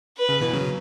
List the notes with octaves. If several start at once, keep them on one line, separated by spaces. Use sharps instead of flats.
B4
C#3
B2 E3
C#3 F#3